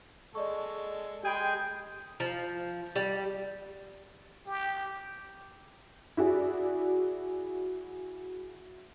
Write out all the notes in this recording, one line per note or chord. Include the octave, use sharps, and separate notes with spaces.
G#3 A4 D5 D#5 C#6
G#3 G4 G#4 G5 B5
F3
G3
G4
E4 F#4 G#4 D5